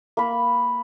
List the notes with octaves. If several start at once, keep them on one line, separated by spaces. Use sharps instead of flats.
A#3 B5